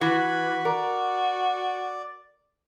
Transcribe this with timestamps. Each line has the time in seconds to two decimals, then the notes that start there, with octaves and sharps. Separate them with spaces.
0.01 E3 F#4 B4
0.65 A#4 D5